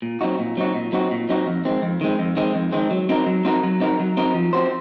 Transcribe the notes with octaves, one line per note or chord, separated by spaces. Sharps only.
A#2
F#3 C4 D#4 F#4
A#2
F#3 C4 D#4 F#4
A#2
F#3 C4 D#4 F#4
A#2
F#3 C4 D#4 F#4
F2
D#3 G#3 C4
F2
D#3 G#3 C4
F2
D#3 G#3 C4
F2
D#3 G#3 C4
F#3
C4 D#4 F#4 A#4
F#3
C4 D#4 F#4 A#4
F#3
C4 D#4 F#4 A#4
F#3
C4 D#4 F#4 A#4
F3
C4 F#4 C5